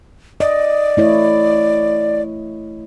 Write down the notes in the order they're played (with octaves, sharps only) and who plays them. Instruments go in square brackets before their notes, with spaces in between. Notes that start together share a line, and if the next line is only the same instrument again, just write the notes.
[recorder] D5 [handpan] D#5
[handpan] A3 E4 C#5